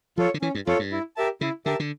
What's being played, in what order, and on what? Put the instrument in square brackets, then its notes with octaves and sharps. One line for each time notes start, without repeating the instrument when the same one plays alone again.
[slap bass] F3 [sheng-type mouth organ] F4 A4 C#5
[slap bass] D3
[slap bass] E3 [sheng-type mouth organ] C#4
[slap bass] G2
[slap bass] F2 [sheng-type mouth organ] F4 A4 C#5
[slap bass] G2
[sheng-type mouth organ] E4
G4 A#4 E5 A5
[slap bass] C#3 [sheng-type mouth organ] E4
[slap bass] D3 [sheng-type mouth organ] G4 A#4 E5 A5
[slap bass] D3